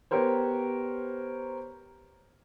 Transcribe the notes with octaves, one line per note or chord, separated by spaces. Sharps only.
B3 G4 A#4 C5 C#5